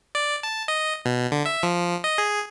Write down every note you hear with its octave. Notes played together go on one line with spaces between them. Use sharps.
D5
A5
D#5
B2
D3
E5
F3
D#5
G#4